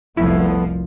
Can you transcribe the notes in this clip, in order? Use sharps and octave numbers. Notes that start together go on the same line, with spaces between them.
F1 C2 F3 A3 B3 E4